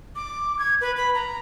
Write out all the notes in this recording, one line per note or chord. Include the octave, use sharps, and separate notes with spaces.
D6
G#6
B4
B5
A#5